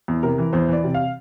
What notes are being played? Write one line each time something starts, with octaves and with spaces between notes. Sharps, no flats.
E2
C3 A#4
E3
E2 C5
E3 D5
C3
F5